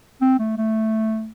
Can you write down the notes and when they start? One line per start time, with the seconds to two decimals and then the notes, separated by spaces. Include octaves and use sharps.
0.21 C4
0.39 A3
0.58 A3